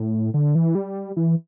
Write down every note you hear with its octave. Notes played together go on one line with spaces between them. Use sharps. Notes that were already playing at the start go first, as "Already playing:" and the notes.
Already playing: A2
D3
E3
G3
E3